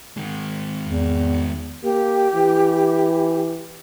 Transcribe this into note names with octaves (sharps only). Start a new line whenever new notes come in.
D#3 G#3
E2
A#3 G4
E3